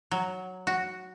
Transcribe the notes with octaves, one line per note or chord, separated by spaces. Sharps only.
F#3
F#4